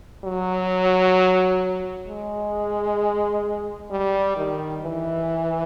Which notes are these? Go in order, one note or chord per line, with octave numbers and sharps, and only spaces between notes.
F#3
G#3
G3
D#3
E3